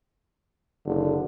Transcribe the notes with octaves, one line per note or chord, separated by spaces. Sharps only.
F#1 D3